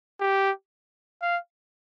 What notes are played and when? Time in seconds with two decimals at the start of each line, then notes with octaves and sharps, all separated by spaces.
0.20 G4
1.22 F5